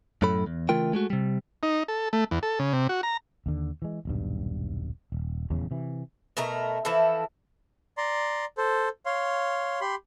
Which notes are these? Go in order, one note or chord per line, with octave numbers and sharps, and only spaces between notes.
F#2 A2 F#3 A4 B5
E2
C#3 E3 A3 F4 A#4 G5
G#3 A3 F#4
C3 G3
D#4
A4
A3
E2
A4
C#3
C3
F#4
A#5
D#2 D3
E3 G#3
D#1 B1 G2
D#1
D#1 E2 C#3
C3 E3
B2 A3 A#4 A#5
E3 F3 E4 A4
D5 A#5 C6
A4 C5
C#5 F5 C6
G4 B5 C6